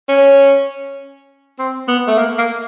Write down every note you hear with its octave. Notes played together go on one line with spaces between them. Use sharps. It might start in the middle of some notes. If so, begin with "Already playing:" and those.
C#4
C4
B3
A3
A#3
A#3